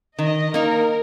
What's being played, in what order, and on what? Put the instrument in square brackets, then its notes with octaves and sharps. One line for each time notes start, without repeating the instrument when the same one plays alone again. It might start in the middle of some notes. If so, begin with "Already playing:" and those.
[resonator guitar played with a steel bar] D#3 [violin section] D#5
[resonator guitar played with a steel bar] A#3 D#4 [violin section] A#4